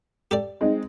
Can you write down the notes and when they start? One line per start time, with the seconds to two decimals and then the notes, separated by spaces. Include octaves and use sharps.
0.31 G4 A4 D5
0.61 G#3 C4 D#4